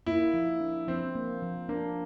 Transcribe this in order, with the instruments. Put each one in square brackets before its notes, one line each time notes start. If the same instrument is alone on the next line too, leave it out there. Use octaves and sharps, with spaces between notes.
[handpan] A#3 [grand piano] E4
[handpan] F3
D4
[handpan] F3 [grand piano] C4
[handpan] A#3
F3
[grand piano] A#3 [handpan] D4